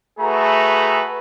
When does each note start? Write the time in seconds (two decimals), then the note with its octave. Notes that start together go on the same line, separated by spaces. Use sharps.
0.20 A3 F#4 G#4 A4 B4 A#5